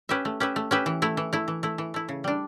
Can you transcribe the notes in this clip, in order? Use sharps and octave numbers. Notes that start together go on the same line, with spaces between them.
C#4 G4 B4 E5
A3
C#4 G4 B4 E5
A3
C#4 G4 B4 E5
E3
A3 E4
E3
A3 E4
E3
A3 E4
E3
A3 E4
C#3
G3 D4